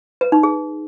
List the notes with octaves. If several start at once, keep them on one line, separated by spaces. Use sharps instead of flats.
B4
D#4
G#4